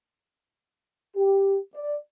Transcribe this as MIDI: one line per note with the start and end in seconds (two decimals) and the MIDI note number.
1.17 1.57 67
1.75 1.97 74